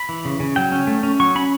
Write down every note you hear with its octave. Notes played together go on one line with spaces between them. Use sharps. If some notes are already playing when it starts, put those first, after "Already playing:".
Already playing: B5
E3
C#3
C#3
F#3 G5
C#4
A3
C#4
F#3 C#6
C#4 B5